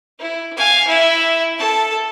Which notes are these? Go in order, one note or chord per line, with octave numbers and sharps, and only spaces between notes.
E4
F5 G#5
E4 E5
A4 A5